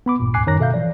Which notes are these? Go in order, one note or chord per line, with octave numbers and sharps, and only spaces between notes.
B3 B5 D6
G#1 G2 A#2
D2 G#2 G#5 D6 F#6 C7
F#2 D#3 C#5 A#5 F#6 A#6
B2 A4 E5 F5 G6
E3 F3 D5